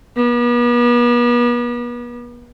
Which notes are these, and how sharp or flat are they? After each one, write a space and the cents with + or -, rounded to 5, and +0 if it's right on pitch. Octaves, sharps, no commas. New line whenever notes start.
B3 -40